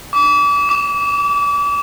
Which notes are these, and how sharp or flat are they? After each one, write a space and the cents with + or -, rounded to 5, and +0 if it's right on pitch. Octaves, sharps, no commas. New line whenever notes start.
D6 -35
D6 -10